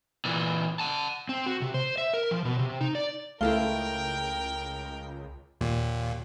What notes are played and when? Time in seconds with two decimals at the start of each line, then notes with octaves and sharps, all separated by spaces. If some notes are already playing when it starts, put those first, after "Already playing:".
0.25 A#2 E3
0.80 F#5 A5
1.29 C4
1.46 F#4
1.62 C3
1.74 C5
1.98 E5
2.14 A#4
2.31 F3
2.45 B2
2.59 C3
2.81 D#4
2.95 D5
3.41 C#2 A3 E4 A4 A#4 F5 G5 C6
5.61 D#2 A#2